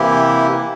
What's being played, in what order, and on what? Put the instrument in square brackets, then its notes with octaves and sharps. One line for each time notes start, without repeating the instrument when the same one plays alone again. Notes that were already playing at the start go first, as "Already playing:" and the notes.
Already playing: [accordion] C3 E3 A#3 E4 G4